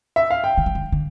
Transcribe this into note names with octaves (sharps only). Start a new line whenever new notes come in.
E5
F5
G5
D3
E3
D3
D3